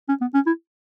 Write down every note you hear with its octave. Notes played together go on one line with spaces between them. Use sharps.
C#4
B3
C#4
E4